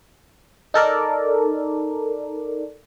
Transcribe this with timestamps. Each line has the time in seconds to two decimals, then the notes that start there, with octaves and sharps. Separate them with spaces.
0.74 D#4 A4 A#4 D5